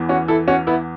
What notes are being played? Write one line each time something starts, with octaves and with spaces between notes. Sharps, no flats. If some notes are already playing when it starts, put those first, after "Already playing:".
Already playing: E2 E3
C#4 F#4
E4 A4
C#4 F#4
B3 E4